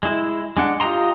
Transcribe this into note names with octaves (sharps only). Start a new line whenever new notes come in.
G#3 E4
G#3 D4 F#5
F4 G4 D#5 A#5 C6